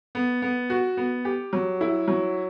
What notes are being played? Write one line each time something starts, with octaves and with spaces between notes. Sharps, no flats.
B3
B3
F#4
B3
G4
F#3
E4
F#3